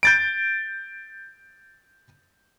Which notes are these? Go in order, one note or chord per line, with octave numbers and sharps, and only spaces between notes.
G6 A6 D7